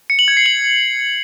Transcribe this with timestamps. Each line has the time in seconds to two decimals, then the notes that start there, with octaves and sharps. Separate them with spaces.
0.10 C#7
0.19 F#7
0.28 G#6
0.37 C7
0.46 F#7